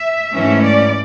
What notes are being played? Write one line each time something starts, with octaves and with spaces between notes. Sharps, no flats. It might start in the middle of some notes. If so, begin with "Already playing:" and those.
Already playing: E5
G#2 E3 A3 C#4
D5